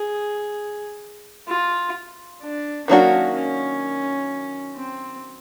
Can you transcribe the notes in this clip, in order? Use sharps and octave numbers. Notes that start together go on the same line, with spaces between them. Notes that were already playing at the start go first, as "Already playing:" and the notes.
Already playing: G#4
F4
D4
D#3 F#3 A#3 C#4 D4 F#4
C#4
C4